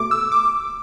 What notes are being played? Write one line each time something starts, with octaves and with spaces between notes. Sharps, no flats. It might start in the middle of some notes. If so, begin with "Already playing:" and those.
Already playing: B2 A3 D6
E6
D6